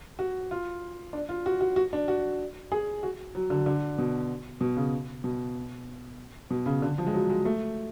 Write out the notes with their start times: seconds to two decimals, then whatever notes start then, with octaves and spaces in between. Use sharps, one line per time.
0.19 F#4
0.51 F4
1.13 D4
1.29 F4
1.46 F#4
1.61 F#4
1.76 F#4
1.93 D4
2.08 F#4
2.72 G#4
3.03 F#4
3.35 F#3
3.50 D3
3.66 D3
3.98 B2
4.61 B2
4.77 C#3
5.24 B2
6.51 B2
6.66 C#3
6.82 D3
6.98 F3
7.06 G#3
7.14 F#3
7.30 G#3
7.45 A3